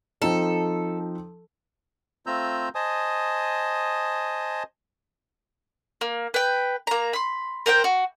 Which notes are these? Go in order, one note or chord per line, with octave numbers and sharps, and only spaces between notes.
F3 C4 D#4 A4
A3 C4 F4 A#5 E6 G6
C5 D#5 G#5 A5 D#6
A#3
B4 G5
A#3 A#5
B5 C6
A#4 C5 F#5 G5
F#4